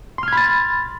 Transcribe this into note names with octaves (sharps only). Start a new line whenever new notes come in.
B5 C6 F6 G#6 A6